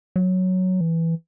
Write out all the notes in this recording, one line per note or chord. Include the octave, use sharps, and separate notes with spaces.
F#3
E3